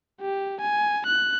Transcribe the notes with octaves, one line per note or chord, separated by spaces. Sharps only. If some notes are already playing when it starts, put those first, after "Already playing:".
G4
G#5
F#6